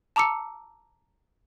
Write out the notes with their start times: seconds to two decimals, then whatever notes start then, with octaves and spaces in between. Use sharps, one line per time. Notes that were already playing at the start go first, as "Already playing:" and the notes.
0.16 A5 A#5 D6 E6 C#7